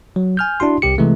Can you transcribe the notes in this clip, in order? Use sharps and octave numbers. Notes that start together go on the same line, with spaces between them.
F#3
G#5 F6 G6
D4 E4 F#4 C6
C2 C3 G4 C#7
C3 E3 G#3 A3